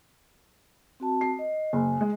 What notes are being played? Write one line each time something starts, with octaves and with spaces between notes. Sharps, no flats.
C4 F#4 A5
C7
D#5
F#1 G#5
G#3